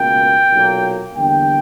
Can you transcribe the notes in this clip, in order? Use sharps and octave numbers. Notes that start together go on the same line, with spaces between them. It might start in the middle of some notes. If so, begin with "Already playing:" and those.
Already playing: C#2 B2 A#3 G5
B1 A#2 F#3 A#3
E2 D3 G3 A#3 G5